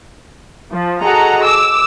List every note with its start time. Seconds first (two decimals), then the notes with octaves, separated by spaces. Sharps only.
0.72 F3
1.01 F#4 G#4 A4 D#5 F#5 A#5
1.45 D6 E6